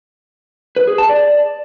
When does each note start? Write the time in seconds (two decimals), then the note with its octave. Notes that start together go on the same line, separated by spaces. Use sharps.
0.76 B4
0.87 G#4
0.98 A5
1.09 D5